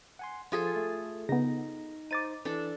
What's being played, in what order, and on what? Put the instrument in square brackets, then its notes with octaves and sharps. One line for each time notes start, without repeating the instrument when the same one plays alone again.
[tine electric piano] F#5 G#5 C6
[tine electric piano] F3 [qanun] F4 G#4 A4
[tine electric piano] A3
[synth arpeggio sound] C#3 B3 [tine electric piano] D#4 A#6
[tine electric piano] D#4 C5 [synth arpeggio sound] D6 A6 D#7
[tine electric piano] E3 [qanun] D4 A4